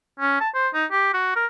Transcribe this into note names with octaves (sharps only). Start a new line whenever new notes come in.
C#4
A5
C5
D#4
G4
F#4
A#4